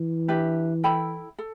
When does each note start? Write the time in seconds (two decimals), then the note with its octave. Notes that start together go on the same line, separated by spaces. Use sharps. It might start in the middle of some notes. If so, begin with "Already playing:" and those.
Already playing: E3
0.28 D4 G4 B4 E5
0.83 E4 A4 G5 B5
1.39 A4